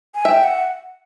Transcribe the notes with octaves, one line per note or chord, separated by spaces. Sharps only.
G#5
E5 G5
F#5